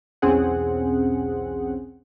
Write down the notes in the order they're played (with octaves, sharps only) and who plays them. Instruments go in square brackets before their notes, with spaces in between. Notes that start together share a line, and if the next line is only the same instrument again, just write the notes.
[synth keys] B1 E2 C4 C#4 G#4 F#5